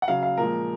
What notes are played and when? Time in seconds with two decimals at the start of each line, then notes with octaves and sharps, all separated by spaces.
0.02 F#5
0.08 C#3 F#3 F5
0.23 F5
0.37 A#2 F3 G#3 A#4